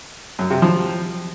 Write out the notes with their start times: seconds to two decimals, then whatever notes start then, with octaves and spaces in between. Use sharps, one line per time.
0.39 F#2
0.51 C3
0.62 F3